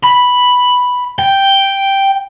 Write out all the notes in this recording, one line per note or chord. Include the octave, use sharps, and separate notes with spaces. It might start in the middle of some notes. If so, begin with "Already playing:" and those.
B5
G5